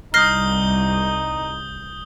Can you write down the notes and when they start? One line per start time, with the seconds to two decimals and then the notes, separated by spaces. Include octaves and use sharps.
0.14 C2 D#4 D#6 F6 G6 A#6 C7 G7